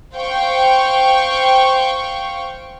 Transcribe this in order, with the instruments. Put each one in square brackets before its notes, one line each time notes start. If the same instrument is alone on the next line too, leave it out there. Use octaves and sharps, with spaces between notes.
[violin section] C5 F5 G5 C#6